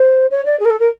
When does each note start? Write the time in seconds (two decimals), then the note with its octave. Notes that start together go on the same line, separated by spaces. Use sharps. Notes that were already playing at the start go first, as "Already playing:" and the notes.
Already playing: C5
0.31 C#5
0.45 D5
0.59 G#4
0.65 A#4
0.70 A4
0.79 A#4